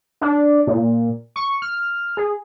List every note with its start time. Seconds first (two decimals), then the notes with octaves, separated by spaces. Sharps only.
0.21 D4
0.67 A#2
1.36 C#6
1.62 F6
2.17 G#4